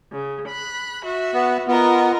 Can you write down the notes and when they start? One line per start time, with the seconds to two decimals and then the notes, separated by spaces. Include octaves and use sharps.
0.12 C#3
0.48 B5 F#6
1.05 F#4 E5
1.34 B3
1.68 B3 F4 A#4 D#5